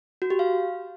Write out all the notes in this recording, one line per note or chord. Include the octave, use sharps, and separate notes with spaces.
F#4
G4
F5